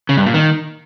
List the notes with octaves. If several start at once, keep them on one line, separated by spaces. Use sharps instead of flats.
C#3
G2
A#2
D#3